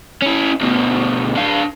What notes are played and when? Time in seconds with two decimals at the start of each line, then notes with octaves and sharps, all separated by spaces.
0.22 C#4 E4
0.61 D2 B2
1.36 D4 F5